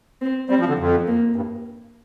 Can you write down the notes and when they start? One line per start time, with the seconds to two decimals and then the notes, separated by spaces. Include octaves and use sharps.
0.21 C4
0.49 G3 C4
0.60 F3
0.68 D3
0.79 F2
1.07 A#3
1.36 G2